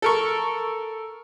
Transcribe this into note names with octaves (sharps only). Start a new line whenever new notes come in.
A4 A#4 C#6